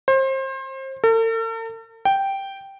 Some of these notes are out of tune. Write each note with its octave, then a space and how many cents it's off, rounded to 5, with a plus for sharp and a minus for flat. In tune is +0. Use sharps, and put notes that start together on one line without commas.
C5 +30
A4 +45
G5 -5